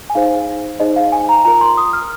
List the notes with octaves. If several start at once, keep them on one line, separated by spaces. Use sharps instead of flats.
G#5
D#4 G#4 C5 F5
D#4 G#4 C5 D#5
F5
G#5
A#5
F4 A#4 A#5
C6
D#6
F6